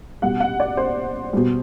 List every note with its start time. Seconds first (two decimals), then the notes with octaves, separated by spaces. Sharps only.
0.22 B2 G3 F#5
0.40 F#5
0.60 D5
0.77 C5
1.33 B2 G3